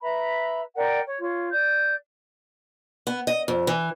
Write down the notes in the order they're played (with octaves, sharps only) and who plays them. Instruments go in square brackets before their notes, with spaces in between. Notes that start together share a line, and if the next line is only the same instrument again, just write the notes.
[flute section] B4 E5 A#5 B5
A#4 D5 F#5 G5
C#5
F4 C#5
D5 G6
[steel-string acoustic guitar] B3
D#5
F2
E3